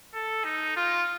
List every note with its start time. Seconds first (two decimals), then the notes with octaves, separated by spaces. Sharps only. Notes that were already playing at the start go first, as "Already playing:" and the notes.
0.14 A4
0.44 D#4
0.76 F4